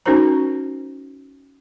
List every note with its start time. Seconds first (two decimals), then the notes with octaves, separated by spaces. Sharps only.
0.06 C#4 D#4 F#4 A#4 C5 A#5